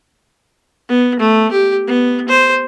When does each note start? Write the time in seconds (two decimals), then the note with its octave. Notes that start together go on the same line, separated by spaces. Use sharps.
0.89 B3
1.19 A3
1.51 G4
1.87 B3
2.29 C5